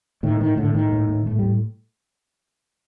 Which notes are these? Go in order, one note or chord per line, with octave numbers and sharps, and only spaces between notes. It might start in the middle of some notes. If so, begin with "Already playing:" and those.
A2 D#3
A2 D#3
A2 D3
A2 D#3
A2
A2
A2 A3
A2 G3